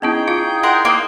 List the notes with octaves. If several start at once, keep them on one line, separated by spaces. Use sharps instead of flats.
B3 C#4 D#4 E4 G#4 G5
E4 F4 F5
A#4 F#5 C6
A#3 D#5